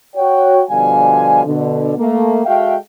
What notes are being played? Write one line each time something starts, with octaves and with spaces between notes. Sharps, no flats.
F#4 C#5 G5
B2 D3 F3 G3 F5 G#5
B2 D3
A3 A#3
G#3 F#4 A4 E5 F5 G5